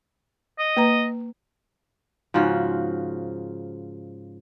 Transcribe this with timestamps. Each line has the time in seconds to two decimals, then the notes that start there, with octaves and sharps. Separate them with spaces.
0.59 D#5
0.77 A#3 B4 A#5
2.34 G#2 C#3 F3 F#4